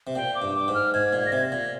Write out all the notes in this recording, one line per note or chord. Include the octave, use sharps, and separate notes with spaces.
C3
A#2 G5
D6
G2
D6
G#2
F6
G#2 G#6
A#2
G#6
A#6
C3 G#6
A#2